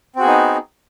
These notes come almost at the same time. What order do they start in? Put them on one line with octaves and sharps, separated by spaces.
C4 F#4 G#4 B3 D#4